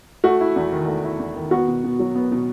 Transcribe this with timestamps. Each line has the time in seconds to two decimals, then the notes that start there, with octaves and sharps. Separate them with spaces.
0.24 A3 F#4
0.41 E4
0.56 E2
0.72 D#3
0.87 A3
1.04 E4
1.19 E2
1.36 D#3
1.51 B3 F#4
1.67 B2
1.84 B2
1.99 F#3
2.15 B3
2.32 B2